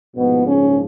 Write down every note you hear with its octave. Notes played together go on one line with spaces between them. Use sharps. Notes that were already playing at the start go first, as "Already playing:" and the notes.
A#1 G#2 B2 F3 B3
C#3 C#4